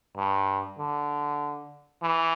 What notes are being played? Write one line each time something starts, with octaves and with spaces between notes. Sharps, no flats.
G2
D3
E3